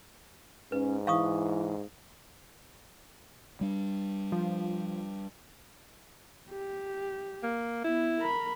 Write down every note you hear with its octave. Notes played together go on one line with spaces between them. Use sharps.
G#2 C#4 B4
E3 F5 C#6 D#6
G3 D4
F3
G4
A#3
B3 E4
A#4 B5